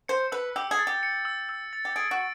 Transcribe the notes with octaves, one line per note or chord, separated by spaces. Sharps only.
C5 C#7
B4 E6
G4 E6
G#4
A6
G4
C#7
E6
E6
A6
G4
G#4 D7
F#4